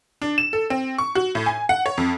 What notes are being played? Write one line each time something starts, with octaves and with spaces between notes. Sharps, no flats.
D4
E7
A4
C4
C#6
F#4
A2
G#5
F#5
C#5
F2